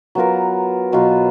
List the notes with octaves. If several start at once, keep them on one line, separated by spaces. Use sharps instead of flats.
F#3 B3 F4 A#4
B2 F#3 B3 F4